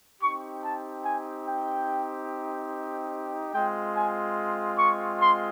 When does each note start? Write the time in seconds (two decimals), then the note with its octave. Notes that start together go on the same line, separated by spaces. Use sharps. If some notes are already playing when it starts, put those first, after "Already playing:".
0.21 C4 D#4 G4 C#6
0.64 A5
1.05 G#5
1.47 G5
3.54 G#3 C4 F4 G5
3.96 G#5
4.78 C#6
5.20 C6